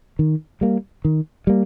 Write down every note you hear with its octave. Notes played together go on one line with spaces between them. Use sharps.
D#3
G3 A#3
D#3
G3 A#3